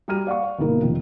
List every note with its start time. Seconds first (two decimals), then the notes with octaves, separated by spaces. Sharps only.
0.08 G3 F#4 A#5 F6 D#7
0.27 D5 F5 F#5 C#6
0.43 D5
0.59 G1 B2 A#3 D#4 A#4
0.82 F1 D#3 F4